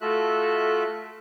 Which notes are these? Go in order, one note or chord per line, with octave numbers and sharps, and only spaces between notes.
A3 F4 F#4 A4 E5 F#6